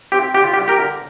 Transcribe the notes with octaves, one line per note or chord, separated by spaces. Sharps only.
C4 G4
D3 G4
F4
G4
G3
G4 A#4
D3